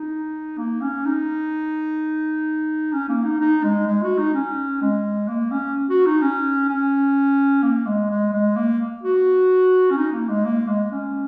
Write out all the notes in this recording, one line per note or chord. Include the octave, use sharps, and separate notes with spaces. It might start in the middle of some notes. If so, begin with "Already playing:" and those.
Already playing: D#4
A#3
C#4
D#4
C#4
A#3
D#4
D#4
G#3
G#3
F#4
D#4
C#4
G#3
A#3
C#4
F#4
D#4
C#4
C#4
A#3
G#3
G#3
G#3
A#3
F#4
C#4
D#4
A#3
G#3
A#3
G#3
C#4